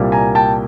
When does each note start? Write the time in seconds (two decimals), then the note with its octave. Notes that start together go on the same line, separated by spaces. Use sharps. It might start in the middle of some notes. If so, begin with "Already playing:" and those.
Already playing: C2 A#2 G3 A#3
0.12 G#5 A#5
0.35 G5 A5